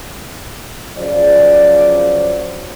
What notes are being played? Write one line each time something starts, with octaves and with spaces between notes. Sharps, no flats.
C#3 F3 F#3 C5 D5